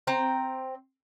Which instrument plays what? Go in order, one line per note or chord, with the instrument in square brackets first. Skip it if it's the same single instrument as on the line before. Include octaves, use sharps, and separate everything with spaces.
[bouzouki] C4 G5 A#5